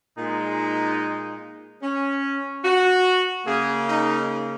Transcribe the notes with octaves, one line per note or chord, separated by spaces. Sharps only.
A#2 G#3 D#4
C#4
F#4
C#3 A#3 G#4
D#4